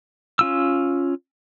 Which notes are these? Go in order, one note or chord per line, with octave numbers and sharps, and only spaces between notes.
C#4 F4 E6